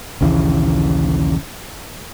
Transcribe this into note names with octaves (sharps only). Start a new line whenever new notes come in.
A#1 D#2 C#3 E3